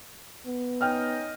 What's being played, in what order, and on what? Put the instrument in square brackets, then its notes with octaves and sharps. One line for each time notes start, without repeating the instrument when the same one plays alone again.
[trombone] B3
[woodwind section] C#4 D#4 D#5 [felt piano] G5 F6